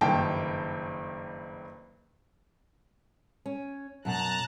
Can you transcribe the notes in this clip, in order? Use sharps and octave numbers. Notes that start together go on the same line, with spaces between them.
F#1 G2 D#3 G5 A5
C#4
F#2 B2 A5 A#5 F#6